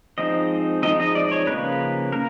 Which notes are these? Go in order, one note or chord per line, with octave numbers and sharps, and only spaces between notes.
F3 G#3 C4 D#4 D#5
F3 G#3 C4 D#4 D#5
D#5
D5
C#5
C#3 F3 A#3 B4
A#3 A#4